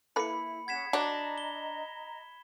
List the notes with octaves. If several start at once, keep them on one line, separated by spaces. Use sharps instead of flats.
A#3 E4 A4 B4 B5 C#7
C#4 G#4 F#5 G#6 B6 E7
D4 F#4 C#5 D#5 A#5
G7